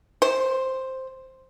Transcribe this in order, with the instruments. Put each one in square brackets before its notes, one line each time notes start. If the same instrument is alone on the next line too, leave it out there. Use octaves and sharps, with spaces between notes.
[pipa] C5